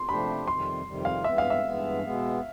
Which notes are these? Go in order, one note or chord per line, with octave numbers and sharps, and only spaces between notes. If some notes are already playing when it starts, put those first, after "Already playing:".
Already playing: C6
C3 F3 A3 D4 G4 B5
F2 C3 D#3 G3 C6
F2 C3 D#3 G3
F5
G2 E3 G#3 B3 E5
F5
E5
G2 E3 G#3 B3
B2 G#3 B3